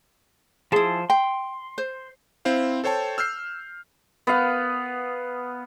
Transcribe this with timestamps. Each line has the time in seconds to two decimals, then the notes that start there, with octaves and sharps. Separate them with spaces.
0.72 F3 E4 G#4 A5 C6
1.10 G5 C6
1.78 C5
2.45 C4 E4 C5 F5
2.84 A4 C5 C#5 G5 A5
3.18 E6 F6 G6 C7
4.27 B3 F5